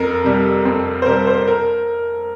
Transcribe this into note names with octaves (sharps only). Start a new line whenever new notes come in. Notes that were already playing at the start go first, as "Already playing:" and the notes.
Already playing: F2 A#4
C3 G3
F2 C4
C5
C3 G3 A#4
C5
A#4